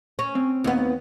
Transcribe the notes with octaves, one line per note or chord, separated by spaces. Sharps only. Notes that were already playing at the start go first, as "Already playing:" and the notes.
C#4
C4
D#2 B3